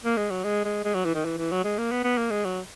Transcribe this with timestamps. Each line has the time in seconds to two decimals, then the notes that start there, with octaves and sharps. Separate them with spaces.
0.04 A#3
0.17 G#3
0.30 F#3
0.44 G#3
0.65 G#3
0.84 G#3
0.94 F#3
1.05 E3
1.15 D#3
1.25 E3
1.38 E3
1.51 F#3
1.64 G#3
1.78 A#3
1.91 B3
2.04 B3
2.17 A#3
2.31 G#3
2.45 F#3